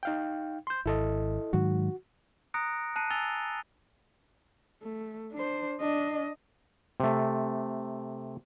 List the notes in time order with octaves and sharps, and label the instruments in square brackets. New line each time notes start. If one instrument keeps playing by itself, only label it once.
[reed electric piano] D#4 F5 G5
C6 G6
[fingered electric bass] G#1 [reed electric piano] E4 A4 D#5
[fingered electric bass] G#2 D#3 F#3 [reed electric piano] F#4
[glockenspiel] A#5 D#6 F#6 A#6 C#7 D7
A5 F#6 C7 C#7 D#7
G#5 E6 F#6 A6 F7 G7
[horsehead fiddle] A3
D4 C5
D4 D#5
[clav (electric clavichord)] C3 A3